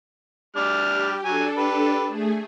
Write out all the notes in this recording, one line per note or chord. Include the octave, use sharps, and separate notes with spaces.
G3 D4 F6
G4
F#3 D4 A4 G#5
G4 B4
A3 G#4